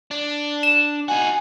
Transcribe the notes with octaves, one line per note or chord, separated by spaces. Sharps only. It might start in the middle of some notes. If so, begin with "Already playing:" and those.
D4
E7
D#4 F#4 G#5